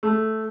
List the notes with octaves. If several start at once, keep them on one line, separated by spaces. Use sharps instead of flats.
A3